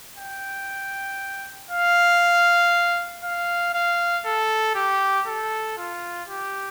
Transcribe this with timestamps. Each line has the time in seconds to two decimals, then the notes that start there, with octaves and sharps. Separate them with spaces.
0.18 G5
1.70 F5
3.24 F5
3.74 F5
4.25 A4
4.75 G4
5.27 A4
5.77 F4
6.28 G4